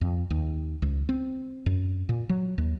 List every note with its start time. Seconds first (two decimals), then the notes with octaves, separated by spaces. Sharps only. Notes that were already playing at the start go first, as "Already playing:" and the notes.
0.01 F2
0.30 D#2
0.82 C#2
1.09 C4
1.66 F#2
2.09 A#2
2.29 F#3
2.58 D#2